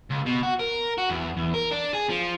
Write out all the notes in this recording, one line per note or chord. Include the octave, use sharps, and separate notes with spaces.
C#2
B2
F#4
A#4
F#4
E2
E2
A#4
D4
G#4
F3